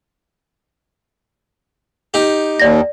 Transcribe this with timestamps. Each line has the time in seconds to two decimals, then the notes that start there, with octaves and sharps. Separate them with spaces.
2.14 D#4 G4
2.60 D#2 D5 A#6